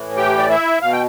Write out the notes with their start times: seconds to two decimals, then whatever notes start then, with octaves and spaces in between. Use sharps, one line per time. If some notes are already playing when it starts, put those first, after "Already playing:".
Already playing: A2 E3
0.17 G4 G5
0.38 D5
0.49 E4 E5
0.82 B2 F5
0.92 G5